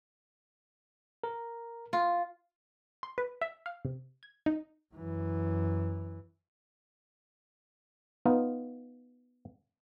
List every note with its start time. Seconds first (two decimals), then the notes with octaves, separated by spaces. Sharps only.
1.24 A#4
1.93 F4
3.03 C6
3.18 B4
3.42 E5
3.66 F5
3.85 C3
4.23 G#6
4.46 D#4
4.94 F#2 E3
8.26 B3 D#4 F4